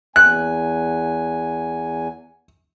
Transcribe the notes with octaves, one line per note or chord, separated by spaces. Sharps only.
E2 G#5 F#6